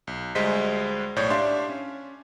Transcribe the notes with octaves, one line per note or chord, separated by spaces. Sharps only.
B1
D2 G3 G#3 C5 D#5 B6
B1 A2 C#5 D5 G6
D4 G4 D5 E5 F5 C6
C#4